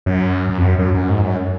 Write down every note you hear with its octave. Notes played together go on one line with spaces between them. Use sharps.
F#2
F#2
F2
F#2
F#2
F#2
G#2
F#2